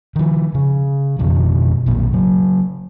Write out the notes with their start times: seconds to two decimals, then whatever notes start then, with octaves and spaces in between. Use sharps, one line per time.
0.16 D#3 F3
0.55 C#3
1.19 F2 B2 D#3 F3
1.86 A#1 F#2 A#2
2.13 C#3 F#3